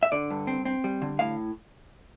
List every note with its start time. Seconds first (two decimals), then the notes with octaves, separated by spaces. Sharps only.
0.03 E5
0.12 D3 D5
0.31 G2
0.47 C4
0.65 C4
0.84 G3
1.02 D3
1.19 A2 F5